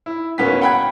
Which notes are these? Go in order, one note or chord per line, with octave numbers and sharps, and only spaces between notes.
E4
D1 A#3 B3 C#4 B6
F#5 G5 B5 F#6 G#6